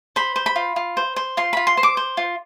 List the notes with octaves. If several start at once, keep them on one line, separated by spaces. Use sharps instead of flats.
C5 B5
C5
B5
F4
F4
C5
C5
F4 C6
F4 B5
C6
C5
D6
C5
F4